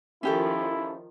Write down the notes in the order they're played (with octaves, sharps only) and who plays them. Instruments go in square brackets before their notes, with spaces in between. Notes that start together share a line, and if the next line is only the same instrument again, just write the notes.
[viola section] D#3 F3 [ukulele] C#4 G4 A4 [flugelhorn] E4